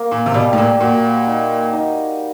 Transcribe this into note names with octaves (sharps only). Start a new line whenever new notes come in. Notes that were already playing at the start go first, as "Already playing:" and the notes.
Already playing: A#3
A#2
C3
B2 G3
A2
A#2
A#2 F#4
D#4
D#4